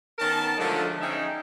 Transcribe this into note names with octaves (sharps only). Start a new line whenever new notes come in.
D#3 B3 C#4 A#4 A5
D3 F3 F#3 G#3 A3 D4
C#4 D#4 G#4 E5 G5